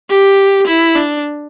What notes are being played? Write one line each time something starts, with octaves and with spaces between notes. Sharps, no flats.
G4
E4
D4